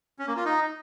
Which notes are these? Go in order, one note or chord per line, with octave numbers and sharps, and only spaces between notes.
C#4
A#3
F4
D#4